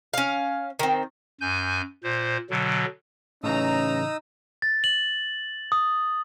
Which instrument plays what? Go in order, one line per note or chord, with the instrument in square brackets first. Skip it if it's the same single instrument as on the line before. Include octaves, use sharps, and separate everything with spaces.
[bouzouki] C#4 F5
D#3 C4
[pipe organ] F#2 G#5 G6
A#2 C5
B2 D3 F#3
[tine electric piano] A2 C#3 E3 [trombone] C#4 [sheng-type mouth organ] D#4 D#6 E6 [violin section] A#5
[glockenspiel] A6
F#7
D#6